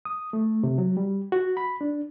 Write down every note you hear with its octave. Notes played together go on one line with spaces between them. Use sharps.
D#6
A3
C3
F#3
G3
F#4
B5
D4